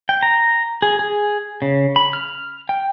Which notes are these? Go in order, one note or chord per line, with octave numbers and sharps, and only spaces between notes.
G5
A#5
G#4
G#4
C#3
B5
F6
G5